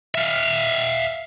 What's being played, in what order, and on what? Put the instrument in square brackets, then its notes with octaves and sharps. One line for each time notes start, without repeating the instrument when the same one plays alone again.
[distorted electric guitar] E5 F5